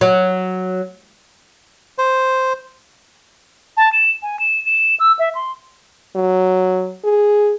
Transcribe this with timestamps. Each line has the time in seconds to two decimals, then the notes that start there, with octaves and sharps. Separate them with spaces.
0.01 F#3
1.98 C5
3.77 A5
3.93 E7
4.23 G#5
4.39 E7
4.66 E7
5.00 E6
5.19 E5
5.35 C6
6.16 F#3
7.04 G#4